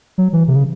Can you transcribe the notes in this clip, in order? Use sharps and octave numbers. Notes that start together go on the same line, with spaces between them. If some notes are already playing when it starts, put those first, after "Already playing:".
F#3
E3
C3
C#3